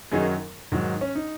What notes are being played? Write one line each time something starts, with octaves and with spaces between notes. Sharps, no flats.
F#2 D#3 F#3 D#4 G#4
G#2 D#3 F#3
C#4
D#4